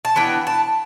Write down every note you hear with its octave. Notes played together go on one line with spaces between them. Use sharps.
A5
E3 B3 D4 G5
A5